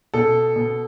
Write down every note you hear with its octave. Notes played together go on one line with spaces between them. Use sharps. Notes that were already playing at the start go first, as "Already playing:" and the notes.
B2 A4
B2